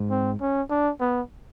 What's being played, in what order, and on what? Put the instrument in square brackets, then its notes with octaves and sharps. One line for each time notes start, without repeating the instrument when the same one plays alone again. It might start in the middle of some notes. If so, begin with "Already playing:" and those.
Already playing: [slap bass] G#2
[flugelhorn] C4
C#4
D4
B3